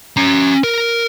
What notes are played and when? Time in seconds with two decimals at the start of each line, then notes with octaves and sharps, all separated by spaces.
0.17 C#4 A#5
0.64 A#4